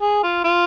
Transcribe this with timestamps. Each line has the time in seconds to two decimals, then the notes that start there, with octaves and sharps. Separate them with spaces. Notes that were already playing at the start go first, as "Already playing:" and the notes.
0.01 G#4
0.23 F4
0.44 F4